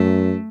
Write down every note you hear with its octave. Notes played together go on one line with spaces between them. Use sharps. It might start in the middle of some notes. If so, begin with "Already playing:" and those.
Already playing: F#2 A3